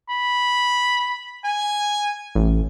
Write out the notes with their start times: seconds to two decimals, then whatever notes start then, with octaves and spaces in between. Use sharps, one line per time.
0.10 B5
1.45 G#5
2.35 A1